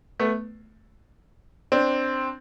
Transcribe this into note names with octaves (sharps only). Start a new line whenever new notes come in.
A3 B3
C4 D4